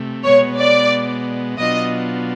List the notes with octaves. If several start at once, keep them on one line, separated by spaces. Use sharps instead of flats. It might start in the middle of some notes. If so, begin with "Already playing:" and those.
Already playing: C3 A3
B2 G#3 B3 C#5
D5
B2 F#3 B3 D4 F4 D#5